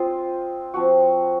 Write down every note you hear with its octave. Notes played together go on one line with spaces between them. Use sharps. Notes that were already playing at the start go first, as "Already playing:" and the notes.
Already playing: C4 F4 C5 D#5
F3 C4 F#4